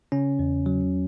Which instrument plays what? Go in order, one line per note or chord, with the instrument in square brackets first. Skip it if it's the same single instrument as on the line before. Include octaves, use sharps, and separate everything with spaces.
[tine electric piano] C#3 C#4
E2
F#3